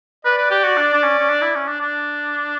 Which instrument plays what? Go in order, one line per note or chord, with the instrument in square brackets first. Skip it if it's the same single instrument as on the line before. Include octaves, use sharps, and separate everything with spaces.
[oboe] B4 [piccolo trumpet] D5
[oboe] B4
G4
F#4
D4
D4
C#4
C#4
D4
E4
C#4
D4
D4